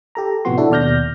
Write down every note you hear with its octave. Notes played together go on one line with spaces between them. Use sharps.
G4 A4 A#5
A2 C3 F3 B3 F#4 C6
D4 E4 F#4 A4
D#2 B2 D5 F6 G6 A#6